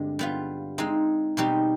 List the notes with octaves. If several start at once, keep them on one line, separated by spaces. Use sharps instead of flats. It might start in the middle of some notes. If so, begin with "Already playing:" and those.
Already playing: G2 D3 G#3 C4 G4
G3 B3 F4
G#3 C4 D#4
B2 G3 C4 D#4 G4